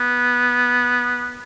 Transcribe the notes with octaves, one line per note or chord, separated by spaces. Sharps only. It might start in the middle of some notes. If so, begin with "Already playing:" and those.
Already playing: B3